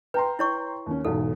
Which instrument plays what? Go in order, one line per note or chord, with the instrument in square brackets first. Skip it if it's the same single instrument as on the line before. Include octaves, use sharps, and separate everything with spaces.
[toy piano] B4 [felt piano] G5 A#5 C6
[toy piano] E4 C#5 C#6
[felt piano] D#2 C#4
[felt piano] B1 E2 G#2 [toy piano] A4